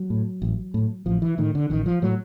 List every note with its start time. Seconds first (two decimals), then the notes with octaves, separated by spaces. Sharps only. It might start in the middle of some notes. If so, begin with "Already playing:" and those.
Already playing: F#3
0.10 A2
0.42 A1
0.74 A2
1.06 A1 F3
1.22 E3
1.38 A2 D#3
1.55 D3
1.70 A1 D#3
1.86 F3
2.02 A2 F#3